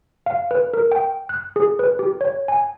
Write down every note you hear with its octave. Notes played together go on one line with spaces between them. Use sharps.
F5
B4
A#4
G5
F#6
G#4
B4
G4
C#5
G#5